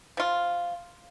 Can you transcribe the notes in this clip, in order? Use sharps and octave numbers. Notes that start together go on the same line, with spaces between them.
F3 F4